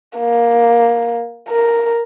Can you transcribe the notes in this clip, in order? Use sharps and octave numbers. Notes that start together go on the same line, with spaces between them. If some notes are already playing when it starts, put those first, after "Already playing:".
A#3
A#4